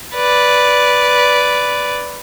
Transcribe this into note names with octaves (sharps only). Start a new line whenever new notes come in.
B4 D5